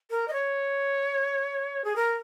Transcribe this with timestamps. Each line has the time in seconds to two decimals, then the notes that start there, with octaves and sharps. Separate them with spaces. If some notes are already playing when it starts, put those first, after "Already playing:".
0.10 A#4
0.28 D#5
0.33 C#5
1.84 G#4
1.96 A#4